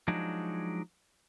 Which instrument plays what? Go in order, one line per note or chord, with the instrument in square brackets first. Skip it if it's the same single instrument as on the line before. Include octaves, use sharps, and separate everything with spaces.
[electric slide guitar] F3 F#3 G#3 D4 D#4